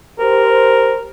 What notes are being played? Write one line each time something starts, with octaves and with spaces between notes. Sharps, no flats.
G4 A#4 C5